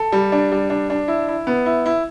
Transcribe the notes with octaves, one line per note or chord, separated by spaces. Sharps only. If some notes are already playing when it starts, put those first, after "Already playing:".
Already playing: A4
G3
D4
G3
D4
D4
E4
E4
B3
E4
E4